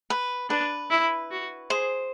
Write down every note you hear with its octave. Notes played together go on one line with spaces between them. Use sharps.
B4
D4 B4
E4
F#4
G#4 C5